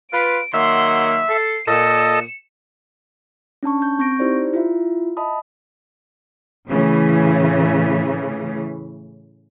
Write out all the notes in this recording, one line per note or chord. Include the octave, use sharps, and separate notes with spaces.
F4 B4 D7
D#3 F#3 A#3 E5 F#5 C6
A4 C7
A#2 A4 D#5 C#7 E7
C#4 D4 A5 C#6
G6
C4 C#6 G6 A#6 D7
D#4 E4 G4 C5 D5
E4 F4 E5
D#5 E5 A5 B5 D#6
A2 C#3 E3